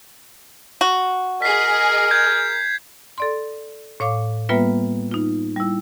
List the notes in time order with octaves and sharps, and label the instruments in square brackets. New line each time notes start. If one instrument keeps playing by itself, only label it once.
[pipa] F#4
[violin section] G#4 D#5 G#5 [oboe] A#4 [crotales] B6 C7
[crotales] G6 G#6
[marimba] A4 D5 C6
A2 C#5 F5 D6
G3 A#3 B3 F4 B4 E5
D#4 F4
G3 E4